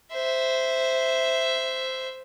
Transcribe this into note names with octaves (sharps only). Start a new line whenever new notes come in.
C5 E5